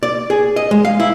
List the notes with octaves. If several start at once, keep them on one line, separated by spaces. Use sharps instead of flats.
D5
G#4
D#5
G#3
F5
E4